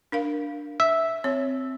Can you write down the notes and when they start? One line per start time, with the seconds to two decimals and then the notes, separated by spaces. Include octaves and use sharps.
0.12 D4 A#4 F5
0.80 E5
1.24 C4 C#5